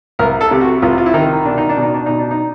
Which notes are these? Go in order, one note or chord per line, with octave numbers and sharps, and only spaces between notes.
C2 A#4
A4
C3
F#4
C2 F4
F4
E4
D#3 D#4
B2 D4
D#4
D4
B2 D#4
D4
B2 D#4
D4
D#4